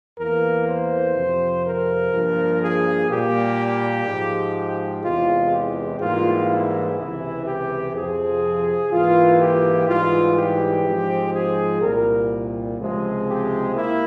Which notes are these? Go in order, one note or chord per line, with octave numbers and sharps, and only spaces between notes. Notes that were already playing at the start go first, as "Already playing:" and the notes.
E2 E3 A#3 A#4
C5
F2 C3 F3 C4
A#4
G2 F3 A#3
G#4
A#2 G3 A#3 G4
G#2 F3 G#3
E2 C3 E3 G#3 F4
G4
G#2 E3 G3 A#3 F4
E4
C#2 C3 E3
G4
F2 C3 F3 C4 G#4
G#2 E3 A#3 F4
G4
G#2 E3 G3 F4
G4
G#2 F3 G#3 C4
G#4
C2 A#2 G3 A#4
C#2 C3 F3 G#3 C4
G4
A#3 E4